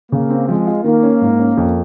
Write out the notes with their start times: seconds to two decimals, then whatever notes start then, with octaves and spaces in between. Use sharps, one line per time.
0.12 C#3 A#3
0.30 C4
0.48 F3 G#3
0.67 F4
0.84 D#3 A#3
1.03 C#4
1.21 G#2
1.39 C#4
1.57 F2